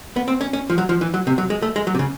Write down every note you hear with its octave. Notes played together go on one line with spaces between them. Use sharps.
B3
C4
C#4
C#4
F3
F#3
F3
E3
F#3
C3
F#3
G#3
A3
G#3
F#3
C3
C#3